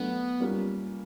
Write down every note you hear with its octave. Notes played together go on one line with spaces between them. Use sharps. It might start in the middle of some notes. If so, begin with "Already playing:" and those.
Already playing: F#3 A3 B3 D4
G3 A#3 C#4 F4